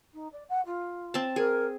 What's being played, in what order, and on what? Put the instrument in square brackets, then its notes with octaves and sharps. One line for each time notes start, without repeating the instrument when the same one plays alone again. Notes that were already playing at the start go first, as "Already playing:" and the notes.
[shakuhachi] D#4
D5
F#5
F4
[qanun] C4 A5
[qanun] G#4 [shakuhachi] A#4